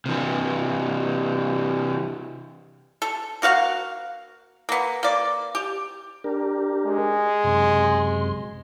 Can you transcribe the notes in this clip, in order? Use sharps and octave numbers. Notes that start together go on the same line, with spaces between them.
C3 E3
A4
A#3 F#4 F5 F#5
A#3 B3
A#3 D5
G4
D4 G4 A#4
G#3
F#2 C3 C6